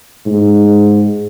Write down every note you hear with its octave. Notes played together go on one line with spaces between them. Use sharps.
G#2